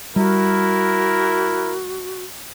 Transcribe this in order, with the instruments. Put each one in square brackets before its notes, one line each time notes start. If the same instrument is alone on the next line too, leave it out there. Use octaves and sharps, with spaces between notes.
[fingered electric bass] G3 [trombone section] E4 A#4 [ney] F#4